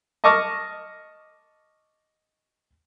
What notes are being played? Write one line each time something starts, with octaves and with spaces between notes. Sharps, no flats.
D#5 A5 C#6 D6 F6